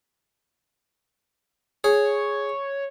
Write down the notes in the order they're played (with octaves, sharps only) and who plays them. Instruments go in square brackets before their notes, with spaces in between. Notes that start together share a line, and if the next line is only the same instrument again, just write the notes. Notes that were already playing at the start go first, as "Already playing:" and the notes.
[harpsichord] G#4 [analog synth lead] C#5